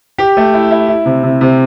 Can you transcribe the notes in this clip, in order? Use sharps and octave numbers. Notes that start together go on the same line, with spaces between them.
G4
A3
E4
E4
E4
C3
C3
C3